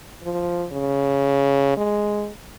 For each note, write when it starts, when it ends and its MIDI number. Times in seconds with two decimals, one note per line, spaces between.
0.23 0.65 53
0.73 1.75 49
1.77 2.30 56